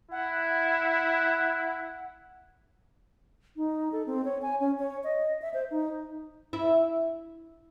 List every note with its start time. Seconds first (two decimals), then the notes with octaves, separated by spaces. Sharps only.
0.11 E4 F#5
3.57 D#4
3.92 A4
4.06 C4
4.25 C#5
4.42 G#5
4.60 C#4
4.79 C#5
5.04 D#5
5.42 E5
5.54 C5
5.71 D#4
6.53 E4